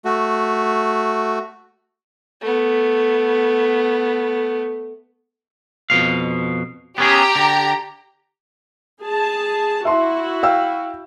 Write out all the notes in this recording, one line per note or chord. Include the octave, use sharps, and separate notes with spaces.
A3 F#4
A3 B3
F2 B2 F5
B3 C#4 G4 G#4 A#5
D3
G#4 A5
E4 F#4 E5 C6
F5 G5 E6